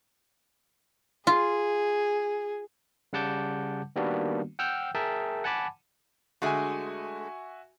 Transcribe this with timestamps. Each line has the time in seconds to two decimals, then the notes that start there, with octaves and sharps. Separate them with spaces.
1.27 F4 G#4
3.13 C#3 G3 F#5 A5 D6 G6
3.96 D#3 G3 A#3 B3 D4 F#4
4.59 F#5 G5 E6 F6 G6
4.95 G#4 A#4 E5 G5 A5
5.44 F#5 G#5 A5 B5 D6
6.42 D3 G#3 A3 F#4 E5 G#5